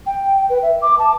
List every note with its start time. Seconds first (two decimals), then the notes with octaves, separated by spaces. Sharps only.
0.06 G5
0.50 B4
0.63 E5
0.82 D6
0.99 A5